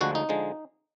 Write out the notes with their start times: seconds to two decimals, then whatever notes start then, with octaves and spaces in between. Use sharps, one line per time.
0.01 D2 D3 F3 G#3 F#4
0.15 D#4
0.29 D3 F3 G#3